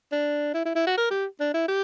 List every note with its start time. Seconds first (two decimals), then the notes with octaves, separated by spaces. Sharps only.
0.12 D4
0.54 E4
0.65 E4
0.75 E4
0.87 F#4
0.97 A#4
1.11 G4
1.40 D4
1.54 E4
1.68 G4